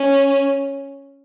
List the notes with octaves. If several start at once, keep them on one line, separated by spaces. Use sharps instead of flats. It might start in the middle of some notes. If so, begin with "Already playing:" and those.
Already playing: C#4